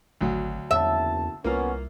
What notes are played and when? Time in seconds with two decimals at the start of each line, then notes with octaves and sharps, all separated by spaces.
0.21 G#1 D2 F#3
0.71 F#1 B1 E2 E5 A5
1.44 C2 A#3 B3 C#4 F4 A#4